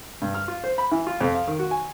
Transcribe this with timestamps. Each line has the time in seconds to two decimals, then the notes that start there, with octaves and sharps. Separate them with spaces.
0.22 G2
0.35 F6
0.48 F4
0.64 C5
0.78 B5
0.91 E3
1.07 F4
1.21 F2
1.35 F5
1.47 D#3
1.59 F#4
1.71 G#5